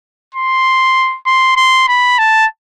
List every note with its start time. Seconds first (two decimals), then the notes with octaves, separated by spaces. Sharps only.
0.34 C6
1.26 C6
1.57 C6
1.88 B5
2.18 A5